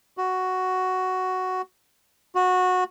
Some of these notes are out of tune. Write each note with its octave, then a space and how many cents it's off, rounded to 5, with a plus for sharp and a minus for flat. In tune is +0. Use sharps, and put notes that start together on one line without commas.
F#4 +5
F#4 -15